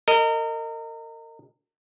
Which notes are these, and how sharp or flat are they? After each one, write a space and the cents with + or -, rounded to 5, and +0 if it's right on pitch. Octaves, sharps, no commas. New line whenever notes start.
A#4 -30 D#5 +0